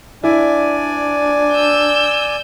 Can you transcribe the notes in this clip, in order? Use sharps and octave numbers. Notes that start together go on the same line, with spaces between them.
D4 E4 D5 G#5
E6 G6